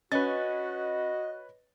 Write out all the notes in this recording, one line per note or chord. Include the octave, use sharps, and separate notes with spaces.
C#4 F#4 B4 C#5 D#5 A6